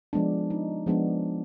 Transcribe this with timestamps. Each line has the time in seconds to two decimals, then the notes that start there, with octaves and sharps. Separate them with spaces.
0.13 F3 G#3 B3 D4
0.50 D#4
0.86 F3 G#3 B3 D4